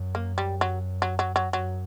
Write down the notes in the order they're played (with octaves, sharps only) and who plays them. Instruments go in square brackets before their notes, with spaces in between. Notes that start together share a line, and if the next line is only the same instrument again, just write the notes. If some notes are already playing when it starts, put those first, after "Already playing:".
Already playing: [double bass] F#2
[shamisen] A#3
G3
F#3
F#3
F#3
F#3
[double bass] F#2 [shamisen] F#3